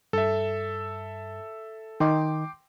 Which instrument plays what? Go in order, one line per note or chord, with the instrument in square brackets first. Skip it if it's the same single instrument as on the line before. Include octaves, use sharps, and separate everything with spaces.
[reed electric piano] G2 [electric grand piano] A4 E5
[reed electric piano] D#3 D#4 [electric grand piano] G5 C6 D6